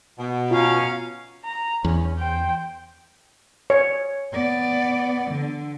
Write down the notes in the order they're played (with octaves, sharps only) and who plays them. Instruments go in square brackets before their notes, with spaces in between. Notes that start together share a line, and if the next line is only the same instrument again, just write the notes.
[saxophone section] B2
[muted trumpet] C#4 [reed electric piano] F4 [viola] F5 A#5
[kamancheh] A#5
[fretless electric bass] E2 [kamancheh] C#4
[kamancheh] C5 G5
[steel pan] C#5
[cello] B3 D5
D3